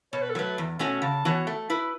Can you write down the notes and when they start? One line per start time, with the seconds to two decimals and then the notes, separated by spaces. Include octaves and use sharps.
0.13 B2 C#5
0.22 B4
0.30 A4
0.35 F#3 A3 B4
0.58 E2
0.79 B2 A3 C#4 F#4
1.02 C#3 A5
1.25 E3 B3 F#4 C#5
1.47 A3
1.70 E4 B4